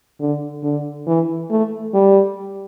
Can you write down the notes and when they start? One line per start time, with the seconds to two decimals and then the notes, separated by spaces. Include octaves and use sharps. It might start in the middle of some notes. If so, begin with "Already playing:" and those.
0.20 D3
0.63 D3
1.07 E3
1.50 A3
1.94 G3